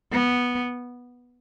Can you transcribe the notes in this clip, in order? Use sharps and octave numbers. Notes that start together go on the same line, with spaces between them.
B3